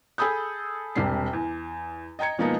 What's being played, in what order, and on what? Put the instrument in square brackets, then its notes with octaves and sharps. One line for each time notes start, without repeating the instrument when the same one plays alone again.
[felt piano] G#4 A4 B5 D#6 G6
E1 C3 G3 C7
E2
D#5 G5 A#5 G#6 C#7
B2 F3 G#3 A#3 B3 D#4